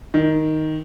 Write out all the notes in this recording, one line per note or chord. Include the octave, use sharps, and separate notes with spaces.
D#3